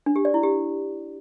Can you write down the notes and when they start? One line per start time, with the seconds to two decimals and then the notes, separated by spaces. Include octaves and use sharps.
0.06 D4
0.16 G4
0.25 D5
0.34 E4
0.43 G4